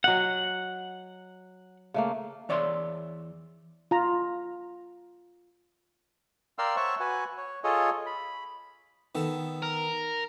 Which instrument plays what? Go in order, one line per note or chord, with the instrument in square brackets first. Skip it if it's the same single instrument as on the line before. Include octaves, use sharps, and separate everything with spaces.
[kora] F#3 D#5 G5 [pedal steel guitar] F#5
[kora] C#3 A3 A#3
[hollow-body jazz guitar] E2 C#5 D5 E5 C6
[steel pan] F4 A#5
[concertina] A#4 D5 F5 G5 C6 E6
C5 C#5 E5 F#5 A5 C#6
F#4 B4 F#5 G#5
C#5
F4 G#4 A4 C#5 D#5
B5
[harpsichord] D#3 B3 A4
[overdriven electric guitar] A#4